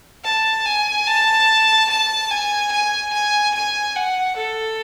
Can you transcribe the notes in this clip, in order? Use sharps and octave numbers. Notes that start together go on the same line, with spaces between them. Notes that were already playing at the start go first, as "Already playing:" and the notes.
A5
G#5
A5
A5
G#5
G#5
G#5
G#5
F#5
A4